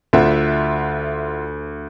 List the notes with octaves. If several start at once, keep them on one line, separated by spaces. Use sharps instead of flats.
D2 F4 E5 F#5